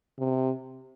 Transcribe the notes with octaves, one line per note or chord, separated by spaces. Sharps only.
C3